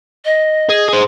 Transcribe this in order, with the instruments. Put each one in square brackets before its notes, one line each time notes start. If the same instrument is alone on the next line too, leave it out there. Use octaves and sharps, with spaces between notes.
[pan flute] D#5
[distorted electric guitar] G#4
G#4 C5